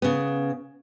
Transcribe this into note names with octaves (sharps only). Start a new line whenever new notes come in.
C#3 B3